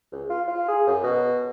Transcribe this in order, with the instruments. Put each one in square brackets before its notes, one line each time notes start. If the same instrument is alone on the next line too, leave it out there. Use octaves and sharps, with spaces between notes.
[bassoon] C#2
F4
F4
G#4
F#2
B2